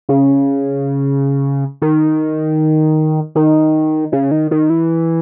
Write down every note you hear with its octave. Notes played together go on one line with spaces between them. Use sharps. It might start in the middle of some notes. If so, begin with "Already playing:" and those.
C#3
D#3
D#3
C#3
D#3
D#3
E3